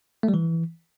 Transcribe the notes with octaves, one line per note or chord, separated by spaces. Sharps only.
A3
G3
E3